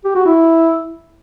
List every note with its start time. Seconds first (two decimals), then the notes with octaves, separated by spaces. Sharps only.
0.05 G4
0.16 F#4
0.26 E4